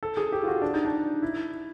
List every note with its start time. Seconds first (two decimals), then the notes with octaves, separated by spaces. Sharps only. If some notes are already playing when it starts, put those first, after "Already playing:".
0.03 A4
0.17 G#4
0.32 G4
0.43 F4
0.47 F#4
0.62 D4
0.74 D#4
0.85 D4
1.22 E4